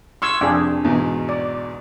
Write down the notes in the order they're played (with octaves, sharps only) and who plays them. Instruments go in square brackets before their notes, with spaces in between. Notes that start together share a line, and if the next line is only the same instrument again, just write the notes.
[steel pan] C6 C#6 E6 [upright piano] F6 G#6
[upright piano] F1 F2 [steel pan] D4 G#4
[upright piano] E2 G#2 B2
[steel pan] D5